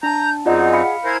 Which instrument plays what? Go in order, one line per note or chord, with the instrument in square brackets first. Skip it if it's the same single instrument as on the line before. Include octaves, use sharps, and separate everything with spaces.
[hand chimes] D4 A5 [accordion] A#5 [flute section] G6
[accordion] F#2 C4 D#4 [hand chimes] F4 D5 D#5 [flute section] G#4 F#5
[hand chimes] F5 B5 C#7
[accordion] E4 A#4 C5 [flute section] G#5 G#6